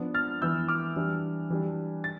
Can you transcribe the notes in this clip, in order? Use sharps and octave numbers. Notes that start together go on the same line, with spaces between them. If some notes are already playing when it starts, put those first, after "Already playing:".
Already playing: F3 B3 D4
F6 A6
E3 B3 E4 E6 G6
D6 F6
E3 G3 D4
E3 G3 D4
A6